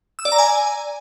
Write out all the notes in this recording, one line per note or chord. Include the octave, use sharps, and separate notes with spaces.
E6
D5
A#5
G#5